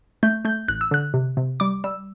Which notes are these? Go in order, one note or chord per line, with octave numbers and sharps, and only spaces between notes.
A3 G6
A3 G6
A1 F#6
E6
D3 F#6
C3
C3
G3 D6
G3 E6